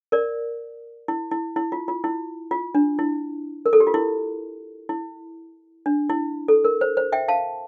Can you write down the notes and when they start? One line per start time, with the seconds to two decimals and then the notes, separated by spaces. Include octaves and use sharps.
0.12 A#4 D5
1.08 E4
1.31 E4
1.56 E4
1.72 F4
1.88 F4
2.04 E4
2.51 F4
2.75 D4
2.99 E4
3.66 A#4
3.73 A4
3.80 G4
3.87 F4
3.94 E4
4.89 E4
5.86 D4
6.10 E4
6.48 A4
6.64 A#4
6.81 C5
6.97 C5
7.12 E5 G5
7.28 F5 A5